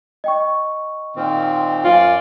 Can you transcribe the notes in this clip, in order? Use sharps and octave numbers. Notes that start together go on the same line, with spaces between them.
D#5 G5 C#6
A#2 D#3 C4
F#2 F4 D5